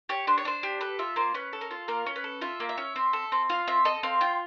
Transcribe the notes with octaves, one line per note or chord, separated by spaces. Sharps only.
G4 C#5
D4 C5
C#5
D4 C5
G4
A4 B4
F4 E5
A#3 C5
C#4 B4
A4
A#4
F4
A#3 A#4
C#4
B4
A4
F4 E5
A#3
E5
C#4
C4
A4
C4
F4 F5
C4 E5
A4 D#5
C4 F5
F4 G5